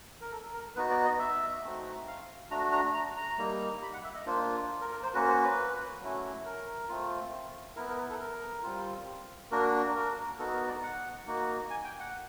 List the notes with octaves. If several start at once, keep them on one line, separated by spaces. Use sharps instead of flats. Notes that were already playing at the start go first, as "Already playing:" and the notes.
A#4
A4
A#4
B3 D#4 F#4 B4
D5
D#5
E5
A3 C4 D#4 F#4
F5
A3 D4 F#4 A#5
A#5
A#5
A#5
G3 A#3 D#4
B5
F#5
E5
D#5
A#3 D4 F4 C5
A#4
A#4
C5
A#3 C#4 F#4 B4
C5
B4
F#3 A3 C#4 E4
A#4
A3 C4 F4
B3 E4 A#4
A#4
B4
A4
A#4
G3 C4 F4
A#3 D4 F#4 A#4
A#4
B3 D#4 F#4 A4
A#4
D5
F#5
A#3 D#4 F#4
G#5
G5
F#5